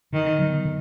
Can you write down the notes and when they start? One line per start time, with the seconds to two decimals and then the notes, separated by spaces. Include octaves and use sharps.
0.13 D3 D#3
0.39 F#3 B3
0.65 D3